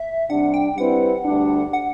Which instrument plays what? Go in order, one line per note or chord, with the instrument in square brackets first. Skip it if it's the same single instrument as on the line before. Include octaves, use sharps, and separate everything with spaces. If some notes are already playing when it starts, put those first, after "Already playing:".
Already playing: [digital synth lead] E5
[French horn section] C3 G3 D4 [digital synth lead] F#5
[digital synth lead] G5
[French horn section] G3 C4 E4 B4 [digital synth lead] F#5
[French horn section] D2 D3 G3 D4
[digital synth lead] F#5